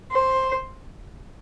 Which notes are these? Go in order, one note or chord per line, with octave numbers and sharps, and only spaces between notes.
C5